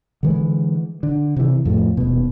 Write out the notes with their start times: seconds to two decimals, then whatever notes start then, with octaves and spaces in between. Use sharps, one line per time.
0.23 D3 E3 G#3
1.03 D3
1.36 C3 E3
1.65 F2 A2
1.97 D#1 B2